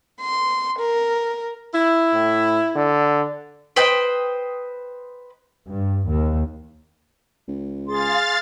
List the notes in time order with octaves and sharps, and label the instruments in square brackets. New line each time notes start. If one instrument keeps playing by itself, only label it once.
[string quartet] C6
A#4
[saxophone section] E4
[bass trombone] A2
D3
[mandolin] B4 C5 D#5 G5
[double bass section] G2
D#2
[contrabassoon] C#2
[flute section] G#4 C6 [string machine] F5 A6